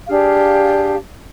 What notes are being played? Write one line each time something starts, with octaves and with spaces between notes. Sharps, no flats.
D4 G4 G#4 F5